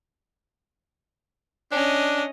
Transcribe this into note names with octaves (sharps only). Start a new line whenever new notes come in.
C#4 D4 D#5